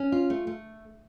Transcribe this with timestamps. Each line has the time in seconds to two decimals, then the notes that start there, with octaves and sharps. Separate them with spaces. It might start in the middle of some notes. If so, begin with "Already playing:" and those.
Already playing: C#4
0.12 F4
0.30 A3
0.47 A3